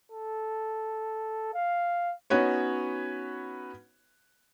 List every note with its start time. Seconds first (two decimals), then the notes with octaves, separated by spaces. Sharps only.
0.12 A4
1.54 F5
2.30 B3 C#4 D#4 F#4 B4 C#5